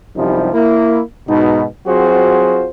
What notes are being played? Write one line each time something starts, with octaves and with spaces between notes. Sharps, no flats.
F#2 C3 F3 G3 D#4 E4
A#3 E4
G#2 B2 D#4
F#3 C4 F4 F#4 G#4 C5